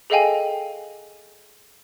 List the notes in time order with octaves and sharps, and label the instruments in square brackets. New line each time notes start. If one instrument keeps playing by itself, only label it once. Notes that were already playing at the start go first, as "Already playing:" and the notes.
[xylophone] G#4 A4 D#5 F5 G5 G#5